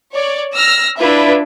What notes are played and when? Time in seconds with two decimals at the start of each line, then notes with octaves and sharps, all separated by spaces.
0.13 C#5 D5
0.55 E6 F6 A#6
0.98 D4 E4 F4 B4 E5